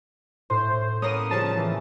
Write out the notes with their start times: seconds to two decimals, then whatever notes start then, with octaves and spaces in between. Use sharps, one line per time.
0.50 A2 C5
1.02 A#3 B3 C#4 D#6
1.31 C#3 F3 G3 A5
1.57 E3